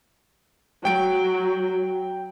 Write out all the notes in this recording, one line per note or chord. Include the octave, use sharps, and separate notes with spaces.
F#3 G5 D7